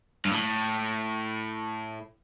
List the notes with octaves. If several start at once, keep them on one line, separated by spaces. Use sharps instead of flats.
G2
A2